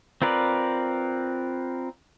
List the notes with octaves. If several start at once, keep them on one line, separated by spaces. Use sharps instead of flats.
C4 F4 A#4 B4 D5